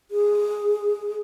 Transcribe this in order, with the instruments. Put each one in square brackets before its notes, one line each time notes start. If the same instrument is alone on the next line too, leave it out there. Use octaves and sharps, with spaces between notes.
[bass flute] G#4